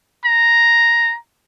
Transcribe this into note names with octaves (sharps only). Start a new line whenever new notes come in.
A#5